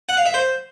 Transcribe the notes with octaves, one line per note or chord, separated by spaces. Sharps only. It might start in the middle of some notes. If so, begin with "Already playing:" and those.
F#5
F5
E5
C5